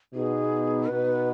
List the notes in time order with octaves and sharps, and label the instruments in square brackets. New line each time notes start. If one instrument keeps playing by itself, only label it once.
[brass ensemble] B2 B3 D#4 [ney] G#4
[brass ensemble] B2 B3 D#4 [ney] B4